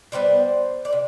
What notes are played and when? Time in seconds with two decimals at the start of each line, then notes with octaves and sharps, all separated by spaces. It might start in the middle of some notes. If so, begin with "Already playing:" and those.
0.12 D3 G3 B3 C5 D5
0.85 D5
0.93 C3